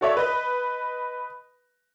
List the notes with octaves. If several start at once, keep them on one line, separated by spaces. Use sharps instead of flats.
F#4 A4 C#5 D5 E5
B4 D#5